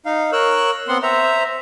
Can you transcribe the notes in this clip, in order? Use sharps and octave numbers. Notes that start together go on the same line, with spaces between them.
D#4 F5
A#4 C#5 E6 F#6
B3 C4 F#5 C6
C5 E5 A#5